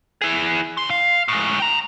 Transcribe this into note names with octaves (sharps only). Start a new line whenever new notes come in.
E4 G#4
C#3 C6
F5
A2 G#3
G5 A#5